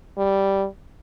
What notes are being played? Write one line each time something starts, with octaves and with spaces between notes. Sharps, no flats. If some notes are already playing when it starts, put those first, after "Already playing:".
G3